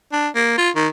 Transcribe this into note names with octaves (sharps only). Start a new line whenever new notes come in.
D4
A#3
F4
D#3